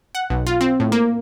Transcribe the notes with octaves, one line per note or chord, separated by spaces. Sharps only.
F#5
B1
F4
C4
A2
A#3